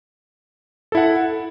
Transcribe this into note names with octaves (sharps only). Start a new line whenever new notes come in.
E4 A4 F#5